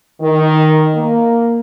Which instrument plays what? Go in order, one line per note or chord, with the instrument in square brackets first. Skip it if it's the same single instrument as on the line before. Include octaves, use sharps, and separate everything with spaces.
[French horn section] D#3
A#3